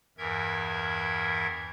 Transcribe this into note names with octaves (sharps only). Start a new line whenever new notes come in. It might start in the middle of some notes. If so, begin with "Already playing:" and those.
E2 G2 E3 A#4 E5 G#6